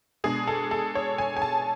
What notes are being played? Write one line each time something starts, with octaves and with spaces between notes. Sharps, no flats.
B2 G#3 D4 G#4
A4
A4
C#5
G#5
G#5
A5